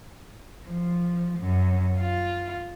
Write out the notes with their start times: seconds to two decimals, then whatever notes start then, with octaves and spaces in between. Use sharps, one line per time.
0.66 F3
1.40 F#2
1.99 F4